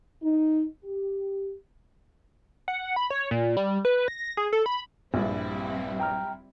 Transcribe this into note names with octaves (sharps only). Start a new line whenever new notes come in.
D#4
G4
F#5
B5
C#5
A#2
G3
B4
A#6
G#4
A4
B5
A#1 G2 G3 C4 E4
G5 A#5 F6